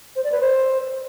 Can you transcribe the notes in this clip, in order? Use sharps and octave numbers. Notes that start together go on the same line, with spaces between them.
C5
D5
B4
C5